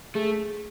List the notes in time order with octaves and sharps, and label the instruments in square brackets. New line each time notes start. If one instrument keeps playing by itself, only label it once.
[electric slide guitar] A3 [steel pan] G#4